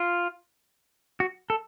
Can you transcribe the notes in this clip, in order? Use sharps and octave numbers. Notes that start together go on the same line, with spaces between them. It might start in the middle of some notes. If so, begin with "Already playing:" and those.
Already playing: F4
F#4
A4